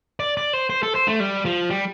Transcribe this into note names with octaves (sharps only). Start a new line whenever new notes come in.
D5
D5
C5
C5
A4
C5
A3
G3
F3
G3